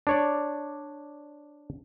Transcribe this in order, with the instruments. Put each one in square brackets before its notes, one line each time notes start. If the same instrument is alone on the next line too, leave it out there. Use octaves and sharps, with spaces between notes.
[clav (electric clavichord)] D4 C#5 D5